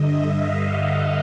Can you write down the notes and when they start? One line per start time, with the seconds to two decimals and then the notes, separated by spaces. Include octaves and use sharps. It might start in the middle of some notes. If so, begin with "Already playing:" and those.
Already playing: G2 D3 D#5 E5
0.25 F5
0.59 F#5